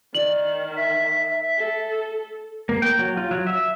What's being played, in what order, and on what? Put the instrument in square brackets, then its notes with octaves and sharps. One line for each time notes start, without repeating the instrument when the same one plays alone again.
[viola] D#3 [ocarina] D5 [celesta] F#7
[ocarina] E5 [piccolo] B6
[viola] A4
[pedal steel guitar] A#3
G5
F#3
F4
F#3
E5